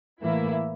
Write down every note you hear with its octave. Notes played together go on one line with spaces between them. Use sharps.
A2 E3 A#3 E4